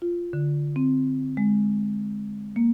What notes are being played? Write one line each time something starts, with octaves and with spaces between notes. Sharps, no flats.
F4
D3
C4
G#3
A#3